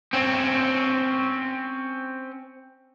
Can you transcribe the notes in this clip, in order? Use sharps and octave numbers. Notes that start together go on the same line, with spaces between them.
C4 C#4